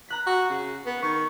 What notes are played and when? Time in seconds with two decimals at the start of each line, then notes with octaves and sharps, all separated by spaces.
0.09 A#5 F#6 B6
0.26 F#4
0.49 C#3
0.86 B3
1.02 D#3 C#6